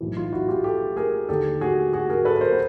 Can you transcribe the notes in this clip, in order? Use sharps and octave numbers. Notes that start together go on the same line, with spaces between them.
B1 A2 E3
D#4 F4
E4 F#4
F4 G4
G4 A4
G#4 A#4
D#2 D3 G4 A4
F#4 G#4
F#4 G#4
G#4 A#4
A4 B4
B4
A#4 C5
B4